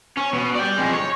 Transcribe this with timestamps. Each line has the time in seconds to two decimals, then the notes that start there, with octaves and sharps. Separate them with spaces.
0.17 C#4
0.34 B2
0.55 D5 G5
0.78 F2 G#3
0.93 C#5